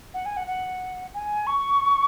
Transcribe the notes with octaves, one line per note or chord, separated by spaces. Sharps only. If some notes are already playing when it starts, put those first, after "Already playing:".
F#5
G#5
F#5
F#5
G#5
C#6